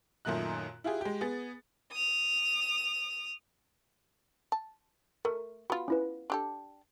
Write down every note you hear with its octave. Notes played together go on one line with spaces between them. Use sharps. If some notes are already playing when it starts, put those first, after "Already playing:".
F#2 A#2 D#3 A3 D#4 F#6
E4 F4 G4 G#4
G#3 G4
B3 G#4 A6
D#6 F7
A5
A3 A#4
B3 F4 F#4 B5
C#4 E4 B4
D4 G4 A4